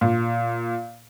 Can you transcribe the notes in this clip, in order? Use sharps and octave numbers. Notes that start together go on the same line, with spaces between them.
A#2